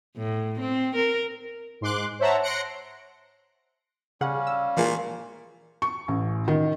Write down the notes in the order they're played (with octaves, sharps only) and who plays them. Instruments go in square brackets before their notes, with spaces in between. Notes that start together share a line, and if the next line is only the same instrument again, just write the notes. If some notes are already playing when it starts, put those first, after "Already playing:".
[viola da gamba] A2
C4
A#4
[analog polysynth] G#2 C6 D6 F#6
C5 C#5 E5 F#5 A5 A#5
C6 F#6 A#6 C#7 D7
[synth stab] C#3 G#4 F#5 [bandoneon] G3 C#4 [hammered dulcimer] F5
[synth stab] E6
[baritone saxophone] A#2 [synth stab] E3 F3 G#3
[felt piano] C#6
A1
D#3